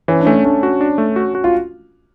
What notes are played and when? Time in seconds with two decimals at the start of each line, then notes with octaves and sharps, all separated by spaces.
0.08 E3 C#4
0.20 D4
0.26 A3 C#4
0.45 A3 D4
0.63 F#4
0.81 D4
0.98 A3
1.16 F#4
1.35 F#4
1.44 F4